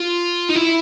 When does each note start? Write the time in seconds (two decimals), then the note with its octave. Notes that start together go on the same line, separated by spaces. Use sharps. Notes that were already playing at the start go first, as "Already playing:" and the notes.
Already playing: F4
0.49 D#4
0.55 E4